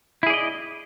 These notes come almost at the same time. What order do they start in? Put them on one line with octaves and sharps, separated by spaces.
E4 G#4 D5 D#5